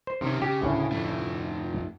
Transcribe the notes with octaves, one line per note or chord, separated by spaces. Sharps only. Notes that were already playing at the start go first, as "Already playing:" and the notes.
C5
C3 D#3 C#4
C#3 G4
D2 A2 C#4
F2 A3